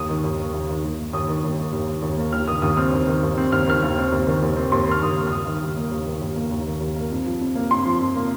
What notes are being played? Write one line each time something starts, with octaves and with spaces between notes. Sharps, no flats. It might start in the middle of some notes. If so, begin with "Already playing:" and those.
Already playing: D#2 D#6
D#3
D#2
A#3
D#2
D#3
D#2
A#3
D#2 D#6
D#3
D#2
A#3
D#2
D#3
D#2
A#3
D#2 F6
D#3 D#6
D#2 D#6
C4 F6
D#2
D#3
D#2
C4
D#2 F6
D#3 F6
D#2
C4
D#2
D#3
D#2
C4
D#2 C6
D#3 F6
D#2 D#6
A#3
F6
D#2 D#6
D#3
D#2
A#3
D#2
D#3
D#2
A#3
D#2
D#3
D#2
A#3
F2
F3
F2
A#3
F2 C6
F3
F2
A#3